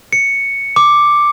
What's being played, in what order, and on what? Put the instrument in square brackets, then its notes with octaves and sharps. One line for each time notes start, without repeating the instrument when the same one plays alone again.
[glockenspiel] C#7
D6